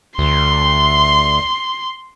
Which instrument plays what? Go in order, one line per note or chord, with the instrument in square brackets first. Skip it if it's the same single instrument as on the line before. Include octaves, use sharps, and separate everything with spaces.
[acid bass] D2 [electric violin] C6